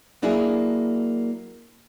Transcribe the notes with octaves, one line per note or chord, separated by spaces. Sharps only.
F#3 A#3 D4 E4 G#4